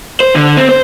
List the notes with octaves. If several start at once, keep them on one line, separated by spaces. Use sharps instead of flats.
C5
D3
C4
C5